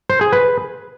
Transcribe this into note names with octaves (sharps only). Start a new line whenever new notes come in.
C5
G#4
B4